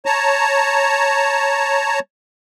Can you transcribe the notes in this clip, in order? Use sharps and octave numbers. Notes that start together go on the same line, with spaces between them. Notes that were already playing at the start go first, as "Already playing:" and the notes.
C#5 A5 A#5